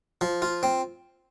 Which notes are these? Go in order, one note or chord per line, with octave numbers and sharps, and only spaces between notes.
F3
F4
C4